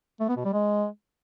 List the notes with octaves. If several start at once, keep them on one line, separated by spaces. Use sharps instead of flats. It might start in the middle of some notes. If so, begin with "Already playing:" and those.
A3
B3
B2
G3
G#3